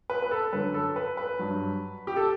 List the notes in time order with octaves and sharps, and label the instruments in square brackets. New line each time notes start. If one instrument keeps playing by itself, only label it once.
[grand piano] B4
B4
A4
F#2 D3 F#3 B4
A4
B4
B4
G2 F#3
G4
A4